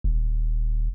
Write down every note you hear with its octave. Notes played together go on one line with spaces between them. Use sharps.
D#1